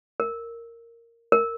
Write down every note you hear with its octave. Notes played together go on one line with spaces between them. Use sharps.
A#4
A#4